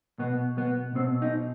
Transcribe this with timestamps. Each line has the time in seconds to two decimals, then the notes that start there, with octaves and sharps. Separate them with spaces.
0.19 B2 B3
0.58 B3
0.95 B2 C4
1.22 D#4